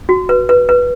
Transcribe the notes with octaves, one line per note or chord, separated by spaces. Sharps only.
F#4
B4
B4
B4